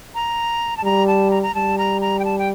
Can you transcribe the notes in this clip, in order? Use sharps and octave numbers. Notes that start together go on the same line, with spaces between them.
A#5
A5
G3 A#5
A5
A#5
A#5
G3 A5
A#5
A#5
G5
A5
G5